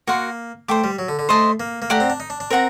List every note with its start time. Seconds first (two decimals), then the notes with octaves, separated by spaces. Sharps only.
0.07 A#3 F#4 A#4 F#5 C6
0.68 A3 C5 G5 D6
0.84 G3
0.99 F#3
1.08 D3
1.19 D3
1.29 A3 C5 D#5 A5 C6
1.60 A#3
1.82 A#3
1.90 A3 G4 D5 F#5 A#5
2.00 C4
2.10 D4
2.20 D#4
2.30 D4
2.40 D4
2.50 C4 A#4 F#5 A#5